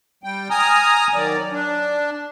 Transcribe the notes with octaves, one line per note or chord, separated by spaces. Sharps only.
G3 G5
G#5 A#5 D#6 F6
D#3 F#3 D5
D4